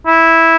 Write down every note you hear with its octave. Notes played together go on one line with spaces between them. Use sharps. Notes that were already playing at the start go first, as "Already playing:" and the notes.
E4